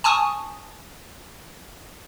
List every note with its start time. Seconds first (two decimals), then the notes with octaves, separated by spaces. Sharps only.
0.04 G#5 A5 C#6 D#6